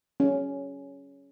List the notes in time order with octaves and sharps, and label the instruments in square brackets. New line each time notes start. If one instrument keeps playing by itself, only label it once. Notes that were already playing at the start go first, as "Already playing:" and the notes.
[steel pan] C#4